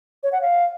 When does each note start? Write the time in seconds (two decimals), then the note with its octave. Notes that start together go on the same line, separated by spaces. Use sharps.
0.23 C#5
0.32 F#5
0.41 F5